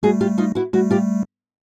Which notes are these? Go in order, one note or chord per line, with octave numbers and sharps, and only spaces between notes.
G3 A3 F#4 G#4
F4 G4
D#4 F4
E4 F#4
G3 A3 E4 F#4
F4 G4